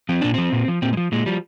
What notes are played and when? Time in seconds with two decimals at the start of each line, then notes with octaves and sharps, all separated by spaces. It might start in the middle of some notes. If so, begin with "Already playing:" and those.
0.09 F3 C4
0.21 A#2 D4
0.34 F3 C4
0.52 A#2
0.68 F3
0.82 A#2 C4
0.93 G#3
0.97 F3
1.12 A#2 G#3
1.26 F3 G3